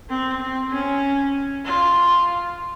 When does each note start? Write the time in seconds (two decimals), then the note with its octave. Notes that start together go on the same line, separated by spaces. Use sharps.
0.09 C4
0.41 C4
0.72 C#4
1.65 F4